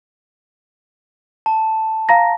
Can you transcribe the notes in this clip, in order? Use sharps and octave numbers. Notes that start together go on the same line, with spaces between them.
A5
F5 A#5 A#6